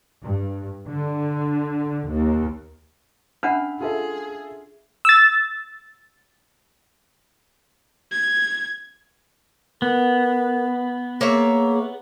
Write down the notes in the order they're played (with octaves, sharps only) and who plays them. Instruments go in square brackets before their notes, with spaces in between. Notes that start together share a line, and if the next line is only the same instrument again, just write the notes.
[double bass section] G2
D3
D#2
[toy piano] C#4 D4 F#5 [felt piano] E5 B5 F6
[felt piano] F4 A4 E5 [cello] G#4
[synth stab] E6 A6
[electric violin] G#6
[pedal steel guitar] B3 [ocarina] A#4
[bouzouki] A#3 C#5 E5 [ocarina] G#4